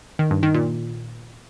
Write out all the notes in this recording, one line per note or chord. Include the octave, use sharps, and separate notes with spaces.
D#3
G2
D#3
A#2